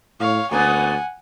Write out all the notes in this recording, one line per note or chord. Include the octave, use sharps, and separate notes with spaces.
A2 C#5 F5
D2 A#3 B3 C#4 F#5 G#5